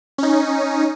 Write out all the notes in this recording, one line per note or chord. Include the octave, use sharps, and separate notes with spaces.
C#4 D#4